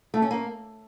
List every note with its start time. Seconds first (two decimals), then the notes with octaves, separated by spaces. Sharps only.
0.14 A3
0.22 C#4
0.31 A#3